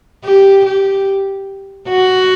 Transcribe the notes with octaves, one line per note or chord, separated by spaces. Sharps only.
G4
G4
F#4